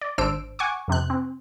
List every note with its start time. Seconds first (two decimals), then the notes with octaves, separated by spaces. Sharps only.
0.01 D5
0.18 G#1 D4 C5 E6 D7
0.59 F#5 G#5 C#6 D6
0.88 F2 C3 C4 F#6
1.10 C4